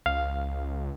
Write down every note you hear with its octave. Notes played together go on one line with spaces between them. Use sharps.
C#2 F5